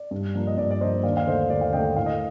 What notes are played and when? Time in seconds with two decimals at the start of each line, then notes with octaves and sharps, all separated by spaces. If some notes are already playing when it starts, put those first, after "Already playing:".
Already playing: D5
0.11 G2
0.34 F3 A#3 D4
0.47 D#5
0.57 G2 D5
0.71 D5
0.81 F3 A#3 D4 C5 D#5
1.04 D#2 D5 F5
1.17 F5
1.26 D3 A3 C5 D#5
1.50 D#2 D5
1.61 F5
1.73 D3 A3 D#5 G5
1.96 A2 F5
2.06 D#5